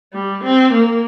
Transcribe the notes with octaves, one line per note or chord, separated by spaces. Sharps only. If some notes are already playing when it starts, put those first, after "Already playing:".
G3
C4
A#3